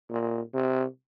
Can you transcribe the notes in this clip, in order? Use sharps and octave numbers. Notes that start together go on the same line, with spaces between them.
A#2
C3